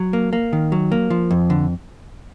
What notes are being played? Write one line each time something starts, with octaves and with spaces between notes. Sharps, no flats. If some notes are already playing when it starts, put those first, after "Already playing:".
Already playing: F#3
A#3
A#3
D#3
F#3
A#3
F3
F2
D3